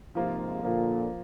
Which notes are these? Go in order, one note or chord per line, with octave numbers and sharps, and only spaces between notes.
G#2 C3 F3 A#3 F4
A#2 D3 F3 A#3 F4